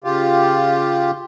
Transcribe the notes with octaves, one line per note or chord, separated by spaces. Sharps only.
C#3 F4 G4